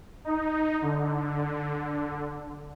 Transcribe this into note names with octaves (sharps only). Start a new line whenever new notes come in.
D#4
D3